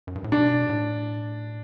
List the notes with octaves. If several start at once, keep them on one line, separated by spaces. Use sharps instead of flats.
F#2
G2
A2
B2 D4
A2